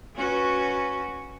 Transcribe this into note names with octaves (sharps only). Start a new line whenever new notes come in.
C#4 F#4 B4